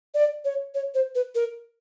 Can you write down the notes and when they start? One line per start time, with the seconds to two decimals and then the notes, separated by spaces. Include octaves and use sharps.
0.14 D5
0.45 C#5
0.74 C#5
0.95 C5
1.15 B4
1.35 A#4